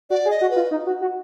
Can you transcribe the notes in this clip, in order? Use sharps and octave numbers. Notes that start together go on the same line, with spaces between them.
F#4 D5
G#4
D#5
F#4
B4
F4
D#4
F#4
F#4